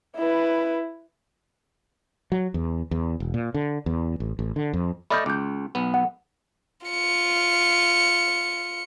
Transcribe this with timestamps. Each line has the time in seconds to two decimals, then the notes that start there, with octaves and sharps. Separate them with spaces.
0.17 E4 B4
2.32 F#3
2.54 E2
2.91 E2
3.20 E1
3.34 A#2
3.54 D3
3.86 E2
4.20 A1
4.39 A1
4.56 D3
4.73 F2
5.10 A3 D5 D#5 B5 F6 G6
5.26 C#2 D6 G6
5.75 B1 B3
5.94 F#5
6.86 F4 C#7